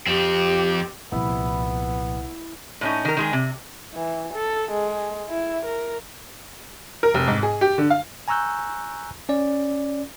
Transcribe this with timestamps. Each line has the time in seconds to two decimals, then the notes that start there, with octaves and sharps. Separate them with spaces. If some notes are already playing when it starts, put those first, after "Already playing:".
0.07 F2 C4 G4
1.12 C2 A#2 F3 B3 E4
2.81 A2 C#4 D#4
3.05 D#3 A#4
3.17 D#3 G#3 G#4
3.33 C3
3.95 E3
4.34 A4
4.72 G#3
5.29 E4
5.65 A#4
7.03 A#4
7.14 F1
7.27 G#2
7.43 G#4
7.61 G4
7.78 D3
7.90 F5
8.28 G#5 A#5 C#6 E6 F#6 G6
9.29 C#4 D5